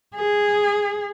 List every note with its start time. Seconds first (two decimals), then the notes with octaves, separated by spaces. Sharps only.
0.16 G#4